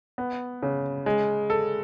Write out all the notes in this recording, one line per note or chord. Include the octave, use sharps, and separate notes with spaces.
B3
C#3
G#3
A4